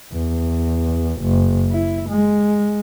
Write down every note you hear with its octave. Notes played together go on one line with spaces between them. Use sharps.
E2
F#1
E4
G#3